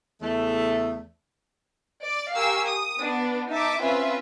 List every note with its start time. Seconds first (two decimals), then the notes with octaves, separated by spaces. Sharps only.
0.22 E2 C#3 A3
2.03 D5
2.34 G4 A#4 F5 G#5 C#6 E6
2.65 D#6
3.01 B3 D4
3.50 D#4 E5 A5 D6
3.81 C4 C#4 F4 B4 E5